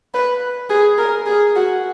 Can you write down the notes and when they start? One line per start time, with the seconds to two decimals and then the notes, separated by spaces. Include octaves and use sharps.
0.14 B4
0.70 G#4
0.98 A#4
1.26 G#4
1.56 F#4